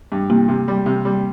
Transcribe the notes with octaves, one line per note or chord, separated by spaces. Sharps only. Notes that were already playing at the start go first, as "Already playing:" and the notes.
G2
C3 A#3
C3
G3
C3
G3